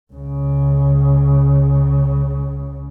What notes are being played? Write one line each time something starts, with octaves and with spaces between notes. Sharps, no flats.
C#2 C#3